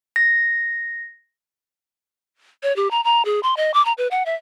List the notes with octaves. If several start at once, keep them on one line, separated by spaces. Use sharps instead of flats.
A#6
C#5
G4
A#5
A#5
G#4
C6
D#5
D6
A#5
B4
F#5
E5